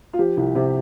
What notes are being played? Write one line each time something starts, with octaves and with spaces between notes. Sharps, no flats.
F4
F3 G4
C2
C3